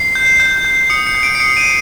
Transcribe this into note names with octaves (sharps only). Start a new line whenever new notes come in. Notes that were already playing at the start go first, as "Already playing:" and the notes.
Already playing: C7
G6
G6
G6
D#6 C#7
C#7
G6
D7
C7
D#6 C#7
D#7
G6